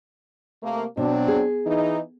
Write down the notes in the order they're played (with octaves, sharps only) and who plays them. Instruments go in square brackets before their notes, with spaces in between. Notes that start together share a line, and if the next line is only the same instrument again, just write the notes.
[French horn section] C3 A3 A#3
[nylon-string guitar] B2 [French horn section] F#3 C4 D4
[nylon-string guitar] G#4
[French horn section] E3 D#4